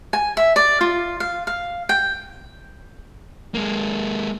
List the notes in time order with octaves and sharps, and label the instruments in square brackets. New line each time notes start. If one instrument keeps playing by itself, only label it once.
[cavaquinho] G#5
E5
D5
F4
F5
F5
G5
[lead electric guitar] G#3 A#3